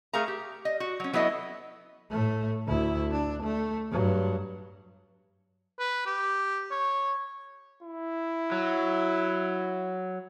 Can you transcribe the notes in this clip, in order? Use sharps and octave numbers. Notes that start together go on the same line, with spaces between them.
A3 G#4 A#4 F5 A#5
G4
D#5
F#4
F#3 C#4
F#3 B3 D4 E4 A4 D#5
A2 A3
D2 E4
D4
A3
G2 F#3
B4
G4
C#5
E4
F#3